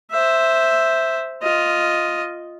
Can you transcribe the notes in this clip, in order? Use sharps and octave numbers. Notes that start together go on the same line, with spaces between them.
C5 E5
F4 D#5